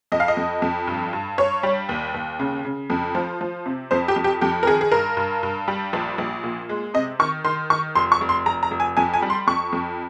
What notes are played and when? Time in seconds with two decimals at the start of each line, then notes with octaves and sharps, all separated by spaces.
0.12 F2 D#5
0.20 F5
0.28 D#5
0.37 F2
0.62 F2
0.87 G2
1.13 G2
1.38 G2 C#5
1.63 G3
1.89 D#2
2.14 D#2
2.39 C#3
2.65 C#3
2.90 F2
3.15 F3
3.41 F3
3.66 C3
3.91 F2 C5
4.08 G4
4.16 F2
4.24 G4
4.41 F2 G4
4.63 A#4
4.67 D#3 G#4
4.81 G#4
4.92 G2 A#4
5.17 G2
5.43 G2
5.68 G3
5.93 A#1
6.18 A#1
6.44 A#2
6.69 G#3
6.94 C3 D#5
7.19 D#3 C#6
7.44 D#3 C6
7.70 D#3 C#6
7.95 F1 C6
8.12 C#6
8.21 F1
8.29 C6
8.46 F1 A#5
8.63 A#5
8.71 F1
8.80 G#5
8.97 F2 G#5
9.14 G#5
9.22 G3
9.30 C6
9.47 F2 C#6
9.72 F2